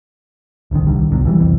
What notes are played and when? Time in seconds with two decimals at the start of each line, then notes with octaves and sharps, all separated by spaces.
0.71 D1 C2 D3 D#3
0.87 C2 D3 D#3 G3
1.10 F1 C2 B2 F#3
1.25 B2 E3 G3
1.40 C2 F2 E3 C4